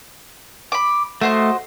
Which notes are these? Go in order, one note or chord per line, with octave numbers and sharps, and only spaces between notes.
B5 D6
A3 F#4 C5 D#5